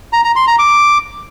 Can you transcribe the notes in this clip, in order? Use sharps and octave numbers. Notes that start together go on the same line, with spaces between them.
A#5
A#5
C6
A#5
D6